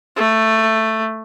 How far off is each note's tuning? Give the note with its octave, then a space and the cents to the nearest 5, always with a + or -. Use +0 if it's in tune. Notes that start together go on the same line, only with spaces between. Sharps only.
A3 +10